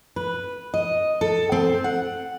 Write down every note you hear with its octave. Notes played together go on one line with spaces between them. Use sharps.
B4
D#5
A4
C4
F#5